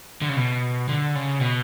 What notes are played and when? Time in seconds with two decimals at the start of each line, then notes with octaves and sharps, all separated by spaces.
0.22 D3
0.29 C#3
0.36 B2
0.89 D3
1.15 C#3
1.41 B2